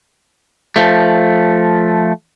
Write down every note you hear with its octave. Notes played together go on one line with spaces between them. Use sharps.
F3 A3